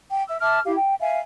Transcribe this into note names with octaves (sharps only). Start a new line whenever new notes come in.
G5
E5 E6
E5 A5 D6 F6
E4 G4 F5
G5
E5 F5 G#5